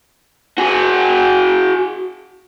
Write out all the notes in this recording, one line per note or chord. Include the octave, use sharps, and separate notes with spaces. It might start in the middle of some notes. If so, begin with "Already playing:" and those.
F#4 G#4